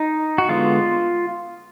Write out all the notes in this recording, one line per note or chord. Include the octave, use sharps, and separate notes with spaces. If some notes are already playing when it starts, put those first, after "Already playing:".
Already playing: D#4
F#4
D3 G#3 B3 F4